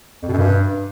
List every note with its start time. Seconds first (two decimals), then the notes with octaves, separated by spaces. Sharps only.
0.23 F2
0.28 B2
0.33 F#2
0.38 G2